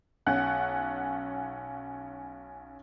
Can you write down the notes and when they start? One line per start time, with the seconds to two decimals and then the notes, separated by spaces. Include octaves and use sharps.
0.26 B1 C#4 F#5 F#6